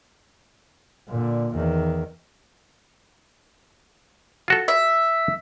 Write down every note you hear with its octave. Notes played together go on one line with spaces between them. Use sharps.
A#2 D3
E2 D#3
F4 F#4 A4
E5